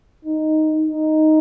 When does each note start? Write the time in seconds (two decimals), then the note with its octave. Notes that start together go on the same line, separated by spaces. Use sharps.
0.25 D#4
0.87 D#4